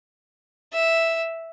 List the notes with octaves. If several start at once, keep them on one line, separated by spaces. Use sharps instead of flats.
E5